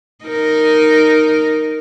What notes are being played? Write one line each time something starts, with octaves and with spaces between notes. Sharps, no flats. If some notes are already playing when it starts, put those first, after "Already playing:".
D#4 A#4